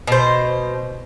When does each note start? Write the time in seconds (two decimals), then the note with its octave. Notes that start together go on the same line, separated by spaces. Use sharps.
0.07 B2 C5